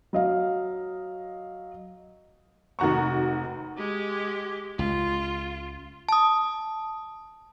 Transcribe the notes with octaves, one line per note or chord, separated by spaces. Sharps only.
F#3 D#5 F5
F1 D#3 F#4 A#5 C#6
G#3 G4
C#2 F4
A5 D#6